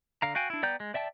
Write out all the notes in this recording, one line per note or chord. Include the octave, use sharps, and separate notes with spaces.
D3 F5 A#5
F#4 F5 G5 G#5
D4 E4
B3 D5 G5 A#5 G6
G#3
D5 E5 G5 A5